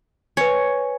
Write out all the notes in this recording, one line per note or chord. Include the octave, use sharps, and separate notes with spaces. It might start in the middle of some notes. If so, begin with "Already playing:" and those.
B4 C#5 G#5